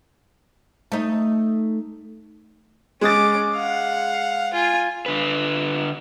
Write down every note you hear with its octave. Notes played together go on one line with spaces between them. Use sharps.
A3 D#4
G#3 C#4 D6 D#6 A6
F5 F#5
F4 G#5
D3 B4